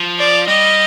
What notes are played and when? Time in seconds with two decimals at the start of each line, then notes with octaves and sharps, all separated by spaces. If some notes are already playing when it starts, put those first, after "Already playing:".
Already playing: F3
0.18 D5
0.47 G3 D#5